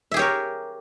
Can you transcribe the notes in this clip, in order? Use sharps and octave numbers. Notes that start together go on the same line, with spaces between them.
G4 G#4 A#4 C#5 E5